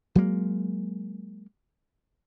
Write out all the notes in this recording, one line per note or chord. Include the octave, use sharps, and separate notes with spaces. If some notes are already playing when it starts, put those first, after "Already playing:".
F#3 G#3 A#3